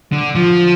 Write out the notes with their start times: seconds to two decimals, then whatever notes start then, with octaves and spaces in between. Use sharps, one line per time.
0.12 D3
0.35 F3